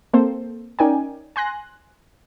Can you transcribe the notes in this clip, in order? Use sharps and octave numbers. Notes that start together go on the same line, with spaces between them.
A#3 C4 A4 C5
C#4 D#4 A#4 D5 G5 G#5
G#5 C6 F#6 A#6